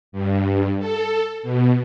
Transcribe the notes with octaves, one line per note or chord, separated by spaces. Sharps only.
G2
A4
B2